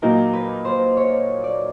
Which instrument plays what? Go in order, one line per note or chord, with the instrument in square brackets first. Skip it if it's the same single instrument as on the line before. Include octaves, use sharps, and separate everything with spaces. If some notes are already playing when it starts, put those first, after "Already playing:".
[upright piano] A#2 F#3 A#3 D#4 [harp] A#4
[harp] B4
C5
C#5
D5